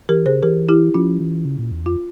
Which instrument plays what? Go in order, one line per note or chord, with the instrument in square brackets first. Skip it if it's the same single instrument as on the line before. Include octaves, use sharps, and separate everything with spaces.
[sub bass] E3 [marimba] G4 A#4
[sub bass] C#3 [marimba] G#4 C5
[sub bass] E3 [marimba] G4 A#4
[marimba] E4 G4
[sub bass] F3 [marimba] C#4 F4
[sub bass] E3
C#3
A#2
E2
[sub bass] F2 [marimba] F4